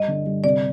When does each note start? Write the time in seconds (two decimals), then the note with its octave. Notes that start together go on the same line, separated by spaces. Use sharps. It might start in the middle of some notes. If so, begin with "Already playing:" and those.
Already playing: G2 D#5
0.08 D3
0.26 G2
0.44 C3 D5